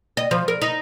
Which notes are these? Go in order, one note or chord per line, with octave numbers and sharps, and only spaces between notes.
D#5
F3
A#4
D#4